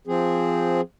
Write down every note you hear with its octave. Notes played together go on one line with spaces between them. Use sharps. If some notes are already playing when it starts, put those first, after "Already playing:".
F3 C4 G#4